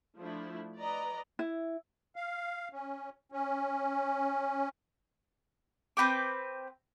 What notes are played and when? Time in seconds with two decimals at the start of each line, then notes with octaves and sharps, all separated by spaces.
0.19 F3 A3 D4 E4
0.76 B4 D5 D#5 A#5
1.39 E4
2.16 F5
2.72 C#4
3.32 C#4
5.97 C4 B4 G5 D6